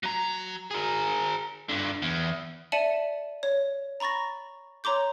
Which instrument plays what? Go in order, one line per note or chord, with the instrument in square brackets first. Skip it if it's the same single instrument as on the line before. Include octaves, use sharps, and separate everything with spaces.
[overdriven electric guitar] F#3 A#5
G#4 A#4
G2 D3
E2
[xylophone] D5 E5 A5 C#7 D#7 F#7
C#5
A#5 B5 C#6 A6 A#6
C#5 A#5 C6 D6 G6